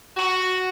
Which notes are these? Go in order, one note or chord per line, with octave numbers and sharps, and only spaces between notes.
F#4